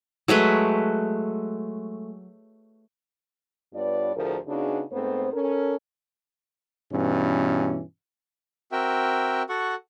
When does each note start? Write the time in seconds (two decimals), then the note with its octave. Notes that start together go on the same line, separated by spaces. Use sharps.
0.28 F#3 G#3 A3 B4
3.74 G2 B3 F4 C#5 D5
4.15 D2 A2 F3 G#4 A#4
4.47 C#3 B3 D4 D#4 F#4 G#4
4.92 G#2 A3 B3 C4 C5
5.33 C#4 A4 A#4
6.92 G2 B2 E3 C#4
8.72 C4 F#4 A#4 E5 G5
9.49 F#4 A4 F#5 C#6